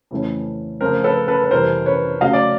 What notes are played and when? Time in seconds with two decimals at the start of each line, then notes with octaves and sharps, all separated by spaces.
0.11 F2 C#3 E3 A3 C#4
0.81 C#3 F3 A3 C4 A#4 C5
1.04 A4 B4
1.28 A4 B4
1.44 B4
1.51 F2 C3 E3 G3 A#4 C5
1.86 B4 C#5
2.21 C#3 F#3 A3 C#4 D#5 F5
2.33 D5